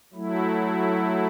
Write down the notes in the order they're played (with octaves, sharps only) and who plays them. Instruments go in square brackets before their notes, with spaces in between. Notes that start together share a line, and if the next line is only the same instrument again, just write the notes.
[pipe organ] F#3 A3 E4